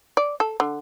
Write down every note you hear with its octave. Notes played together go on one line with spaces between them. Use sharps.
D5
A4
D3